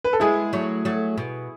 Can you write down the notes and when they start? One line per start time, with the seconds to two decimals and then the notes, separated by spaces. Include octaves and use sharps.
0.04 B4
0.13 A4
0.20 G#3 B3 E4 G#4
0.53 F#3 A3
0.85 F#3 A3
1.18 B2